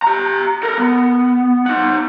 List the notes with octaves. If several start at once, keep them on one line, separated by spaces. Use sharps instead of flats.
G4 A#5
A4 A#4
B3
D#4 F#5